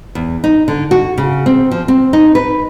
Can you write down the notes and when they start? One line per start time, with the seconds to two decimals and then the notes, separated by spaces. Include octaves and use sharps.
0.15 E2
0.44 D#4
0.68 D3
0.91 F#4
1.18 C#3
1.46 C4
1.71 F3
1.88 C4
2.13 D#4
2.35 B4